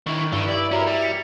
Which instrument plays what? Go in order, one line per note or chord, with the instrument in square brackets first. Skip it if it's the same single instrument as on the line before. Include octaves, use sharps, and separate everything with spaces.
[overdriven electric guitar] D3 E4 [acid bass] D#3 [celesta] C#6
[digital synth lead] G2 [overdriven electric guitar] D3 D#3 [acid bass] E4
[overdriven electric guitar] D5 [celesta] F#7
[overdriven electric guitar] C#4 A#4 [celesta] F#4 E5 A#5
[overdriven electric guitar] G3
[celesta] B6 C#7 F7